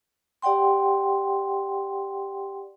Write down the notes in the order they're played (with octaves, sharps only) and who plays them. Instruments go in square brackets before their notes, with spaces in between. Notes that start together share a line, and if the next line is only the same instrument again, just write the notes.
[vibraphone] G4 D5 F#5 G5 C6